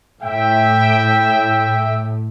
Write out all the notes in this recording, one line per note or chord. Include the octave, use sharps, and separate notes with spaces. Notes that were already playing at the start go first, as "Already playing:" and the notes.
A2 E5 G5